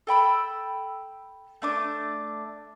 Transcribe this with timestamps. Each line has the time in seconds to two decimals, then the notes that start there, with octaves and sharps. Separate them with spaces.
0.07 A4 G5 B5 E6
1.62 A3 D4 D6